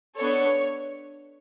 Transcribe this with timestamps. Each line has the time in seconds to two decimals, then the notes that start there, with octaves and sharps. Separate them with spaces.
0.16 B3 D4 A4 C#5